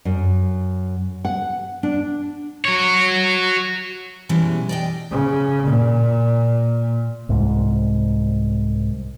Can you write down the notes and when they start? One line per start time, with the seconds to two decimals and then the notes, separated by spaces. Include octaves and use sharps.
0.05 F#2
1.25 F#5
1.83 D4
2.65 F#4 C#5
4.29 B2 E3 G3 G#3 C#4
4.69 D5 D#5 G5
5.10 C#3
5.66 A#2
7.29 C2 G#2